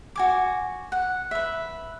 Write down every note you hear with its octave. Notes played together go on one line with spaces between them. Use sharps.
F#4 G#5 D6
F#5
B4 E5